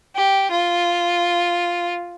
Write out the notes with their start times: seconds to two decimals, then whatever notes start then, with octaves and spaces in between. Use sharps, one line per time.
0.15 G4
0.51 F4